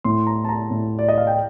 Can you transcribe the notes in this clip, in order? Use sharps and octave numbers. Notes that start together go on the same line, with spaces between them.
A2 C6
A#5
A5
A#5
A2
D5
D#5
F5
G5